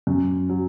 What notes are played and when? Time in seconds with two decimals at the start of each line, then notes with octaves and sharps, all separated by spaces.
0.07 F#2
0.49 F#3